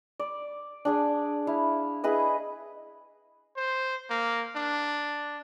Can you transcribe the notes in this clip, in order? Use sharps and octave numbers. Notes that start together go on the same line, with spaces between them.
D5
D4 G#4 D5
E4 F5
E4 G#4 B4 D#5
C5
A#3
D4